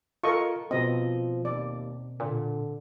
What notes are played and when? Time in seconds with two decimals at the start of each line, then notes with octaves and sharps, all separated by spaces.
0.24 F4 A4 A#4 D#5 C#6
0.71 B2 F3 C4 D#5
1.45 D#2 D5
2.20 A#2 D3